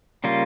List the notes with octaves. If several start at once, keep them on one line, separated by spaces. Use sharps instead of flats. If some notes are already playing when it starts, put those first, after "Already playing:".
C#3 G3 A#3 F4